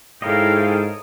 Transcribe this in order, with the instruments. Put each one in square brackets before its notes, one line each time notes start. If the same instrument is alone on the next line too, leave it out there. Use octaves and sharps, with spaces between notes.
[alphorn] G#2 [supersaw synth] E4 A4 [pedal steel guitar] A#4 C#5 D#5 [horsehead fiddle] F5 G5